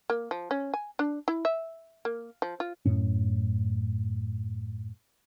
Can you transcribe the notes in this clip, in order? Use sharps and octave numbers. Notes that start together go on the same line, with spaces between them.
A#3
F3
C#4
G#5
D4
E4
E5
A#3
F3
F4
F#2 A2 C#4